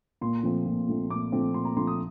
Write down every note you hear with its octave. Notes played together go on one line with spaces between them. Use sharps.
A#2 C6
F3 A3 C4
A#2
F3 A3 C4
A#2 D6
F3 A3 C4
A#2 C6
A#5
F3 A3 C4 C6
D#6